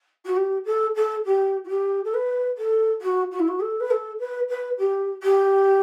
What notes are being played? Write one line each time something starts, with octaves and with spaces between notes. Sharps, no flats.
F#4
G4
A4
A4
G4
F#4
G4
A4
B4
A4
F#4
F#4
E4
F#4
A4
B4
A4
B4
B4
G4
G4